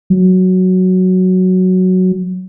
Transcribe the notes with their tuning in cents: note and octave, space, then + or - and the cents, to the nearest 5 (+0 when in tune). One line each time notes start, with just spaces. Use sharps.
F#3 +0